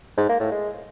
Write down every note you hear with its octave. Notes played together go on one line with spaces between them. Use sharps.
G#2
A#3
A2
G#3